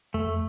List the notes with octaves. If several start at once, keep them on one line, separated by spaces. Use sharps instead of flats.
F2 A3